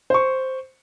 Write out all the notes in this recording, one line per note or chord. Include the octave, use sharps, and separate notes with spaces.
C5 C#6